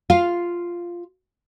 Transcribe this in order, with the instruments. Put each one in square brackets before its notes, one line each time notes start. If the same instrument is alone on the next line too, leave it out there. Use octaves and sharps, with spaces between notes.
[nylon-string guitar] F4 F5